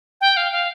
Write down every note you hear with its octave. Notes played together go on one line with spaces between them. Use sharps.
G5
F5
F5